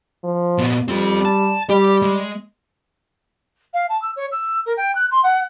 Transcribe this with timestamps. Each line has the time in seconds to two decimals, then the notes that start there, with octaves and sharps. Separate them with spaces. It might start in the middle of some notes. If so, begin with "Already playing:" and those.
0.24 F3
0.58 A#2 B3
0.88 G3 C4 F4
1.25 A5
1.70 G3 G4
2.02 G#3
3.74 F5
3.89 A5
4.02 E6
4.16 C#5
4.32 E6
4.66 A#4
4.77 G5
4.95 F#6
5.11 C6
5.23 F#5